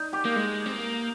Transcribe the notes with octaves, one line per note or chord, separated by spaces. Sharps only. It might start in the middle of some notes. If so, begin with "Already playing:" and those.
Already playing: D#4
G4
A#3
G#3
C4
A#3